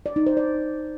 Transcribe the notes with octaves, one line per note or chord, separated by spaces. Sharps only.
D5
D#4
C5
D5